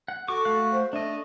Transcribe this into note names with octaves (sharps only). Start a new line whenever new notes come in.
F#5
F#4 A4 C#6 D6
A3 F5 F#6
C5
A3 D4 A4 D#5